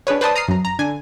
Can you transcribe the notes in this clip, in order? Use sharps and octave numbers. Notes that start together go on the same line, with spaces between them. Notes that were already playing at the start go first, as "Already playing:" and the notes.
D4 G#4 B4 C#5
B4 C5 D5 A5 C6 D#6
A#5 D#6 F6 C7
F#2 A#5
A#5
D3 G#5